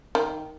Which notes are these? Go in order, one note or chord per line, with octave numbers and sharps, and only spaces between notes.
D#3